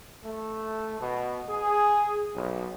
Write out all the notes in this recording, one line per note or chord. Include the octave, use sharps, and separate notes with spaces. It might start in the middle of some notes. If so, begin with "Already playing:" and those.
A3
B2
G#4
B1